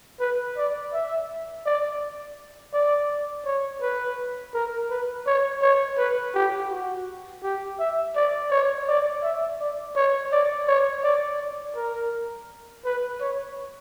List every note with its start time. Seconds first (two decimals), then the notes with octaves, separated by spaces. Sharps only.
0.20 B4
0.57 D5
0.93 E5
1.66 D5
2.73 D5
3.45 C#5
3.82 B4
4.54 A#4
4.90 B4
5.27 C#5
5.62 C#5
5.98 B4
6.34 G4
6.70 F#4
7.43 G4
7.79 E5
8.15 D5
8.51 C#5
8.88 D5
9.23 E5
9.60 D5
9.96 C#5
10.32 D5
10.68 C#5
11.04 D5
11.40 D5
11.76 A#4
12.85 B4
13.20 C#5